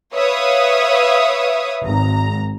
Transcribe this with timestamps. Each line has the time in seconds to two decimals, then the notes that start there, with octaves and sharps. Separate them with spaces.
0.14 B4 C#5 E5 F5 D#6
1.84 G#1 A#5